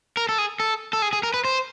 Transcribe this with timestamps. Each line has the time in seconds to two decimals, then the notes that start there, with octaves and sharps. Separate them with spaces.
0.17 A#4
0.29 A4
0.38 G#4
0.60 A4
0.93 A4
1.02 G#4
1.13 G#4
1.23 A#4
1.34 B4
1.45 C5